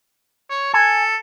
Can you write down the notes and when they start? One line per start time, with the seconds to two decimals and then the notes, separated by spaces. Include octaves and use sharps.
0.50 C#5
0.74 A4 G#5